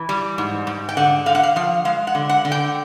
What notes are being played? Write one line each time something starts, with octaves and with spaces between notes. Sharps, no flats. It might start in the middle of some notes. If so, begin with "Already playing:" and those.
Already playing: E3
G3
G#2
G#2
G5
D3 F#5
D3 F5
F#5
F5
F3 F5
G#3 F5
F#5
D3
F#5
D3
G5